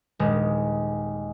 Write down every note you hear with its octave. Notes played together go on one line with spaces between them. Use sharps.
D#1 G#3